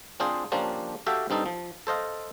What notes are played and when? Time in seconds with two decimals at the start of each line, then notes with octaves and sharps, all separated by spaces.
0.20 C4 D4 F4 G#4 C5
0.52 F3 A#3 C#4 D4 G4 C5
1.06 F#4 G4 A4 E5 F5 G5
1.30 G2 C4 D#4 A4
1.46 F3
1.87 A4 C5 D#5 F5